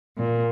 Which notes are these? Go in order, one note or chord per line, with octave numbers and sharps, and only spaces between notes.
A#2